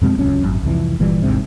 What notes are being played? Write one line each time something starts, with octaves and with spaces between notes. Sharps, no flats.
F2 B2 G#3 C4
D#1 C#2 F#2 C#4
G#1 F#2
C2 F2 E3
G1 A#2 E3 G3
G#1 D2 G#2 C3